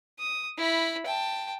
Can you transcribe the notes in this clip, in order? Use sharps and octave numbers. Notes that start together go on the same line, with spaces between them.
D#6
E4 B5
G5 A5